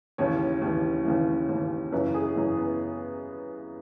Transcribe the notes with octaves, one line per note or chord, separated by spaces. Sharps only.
D#2 C#3 E3 C#5
D#2 C#3 E3
D#2 C#3 E3
D#2 C#3 E3
F#2 C#3 E3 B4
G#4
F#2 C#3 E3
B3